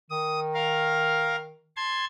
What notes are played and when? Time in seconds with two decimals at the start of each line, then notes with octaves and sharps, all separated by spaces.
0.10 D#3 D#6
0.54 A#4 F5
1.77 A5 C6 G#6